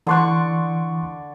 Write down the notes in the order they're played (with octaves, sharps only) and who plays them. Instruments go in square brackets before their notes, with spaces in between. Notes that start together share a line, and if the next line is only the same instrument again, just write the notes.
[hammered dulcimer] D3 D5 C#6 [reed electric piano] E3 C6 F#6